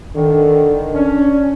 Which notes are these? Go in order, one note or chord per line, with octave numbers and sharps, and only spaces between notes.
D3 D#3
C#4 D4